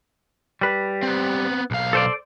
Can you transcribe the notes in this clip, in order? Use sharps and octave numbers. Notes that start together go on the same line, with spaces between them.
G3 B4
B3 C4
B1 F5
A4 C5 D5